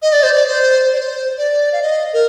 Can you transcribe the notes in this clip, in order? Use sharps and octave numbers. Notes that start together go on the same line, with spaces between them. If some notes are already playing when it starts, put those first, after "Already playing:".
D#5
D5
C5
D5
C5
D5
C5
D5
F5
D#5
A#4